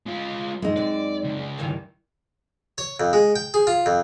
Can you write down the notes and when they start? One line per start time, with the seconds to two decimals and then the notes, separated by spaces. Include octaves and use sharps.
0.07 G#3 F4
0.62 F2 C3 G#3 D#4
0.76 F#2 C4 D4 D5
1.24 C#2
1.58 G2 D#3 E3
2.78 C#5
3.00 F2
3.13 G#3
3.36 G5
3.54 G#4
3.67 F4
3.86 F2